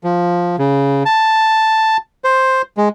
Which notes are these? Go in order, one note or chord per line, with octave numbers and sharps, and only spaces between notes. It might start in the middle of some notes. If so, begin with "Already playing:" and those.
F3
C#3
A5
C5
G#3